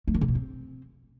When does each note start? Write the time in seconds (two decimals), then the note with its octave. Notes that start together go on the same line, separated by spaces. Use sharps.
0.08 A3
0.14 D#3
0.21 C#3
0.28 B2
0.35 C4